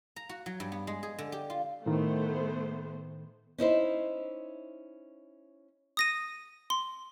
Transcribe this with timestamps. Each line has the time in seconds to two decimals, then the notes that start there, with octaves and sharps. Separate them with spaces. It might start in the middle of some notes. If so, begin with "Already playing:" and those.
0.16 A#5
0.29 F#4
0.46 F#3
0.60 G2
0.72 B3
0.87 G#3
1.03 G#4
1.18 D3
1.32 G4
1.50 F4
1.86 A2 D#3 A3 B3 C5
3.58 C#4 D#4 E4 C5
5.97 D#6 A#6 D#7
6.70 C6